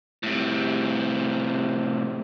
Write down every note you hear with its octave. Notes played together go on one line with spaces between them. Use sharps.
A2 C3